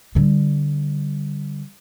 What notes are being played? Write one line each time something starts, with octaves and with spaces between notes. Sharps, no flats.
D3 G3